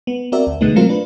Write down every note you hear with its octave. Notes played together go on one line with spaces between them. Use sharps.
B3
C4 F#4 A#4 D5 E5
D2
B2 D3 G#3 A3 B3 D#4
F#3 A3 C4 F4 A#4
D4 B4